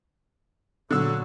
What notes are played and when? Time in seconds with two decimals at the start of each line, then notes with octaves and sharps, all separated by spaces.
0.91 A#2 D3 F#3 E6